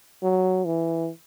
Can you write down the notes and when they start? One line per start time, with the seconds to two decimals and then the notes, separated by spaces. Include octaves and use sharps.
0.23 F#3
0.65 E3